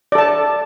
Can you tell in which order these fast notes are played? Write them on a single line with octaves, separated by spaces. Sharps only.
D5 A4 A5